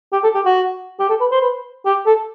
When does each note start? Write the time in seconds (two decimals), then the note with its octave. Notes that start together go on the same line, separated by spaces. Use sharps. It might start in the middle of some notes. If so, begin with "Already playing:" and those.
0.12 G4
0.23 A4
0.35 G4
0.45 F#4
0.99 G4
1.09 A4
1.20 B4
1.31 C5
1.41 B4
1.86 G4
2.06 A4